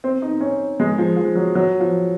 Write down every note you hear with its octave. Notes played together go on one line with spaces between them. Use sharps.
C4
D#4
C#4
G#3
F3
F3
F#3
F#3
F3